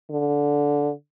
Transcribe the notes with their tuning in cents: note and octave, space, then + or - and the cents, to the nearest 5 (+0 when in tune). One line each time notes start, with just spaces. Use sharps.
D3 -15